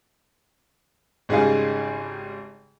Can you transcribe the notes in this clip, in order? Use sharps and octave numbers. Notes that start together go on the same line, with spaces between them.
G#1 C#3 G3 D#4 G#4 F5